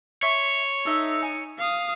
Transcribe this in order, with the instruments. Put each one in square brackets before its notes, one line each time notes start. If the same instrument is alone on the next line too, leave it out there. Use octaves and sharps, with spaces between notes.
[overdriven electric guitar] C#5 [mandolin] E5 C6 C#6
[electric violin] D#4 [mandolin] A4 E5
[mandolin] G#5
[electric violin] F5 D#6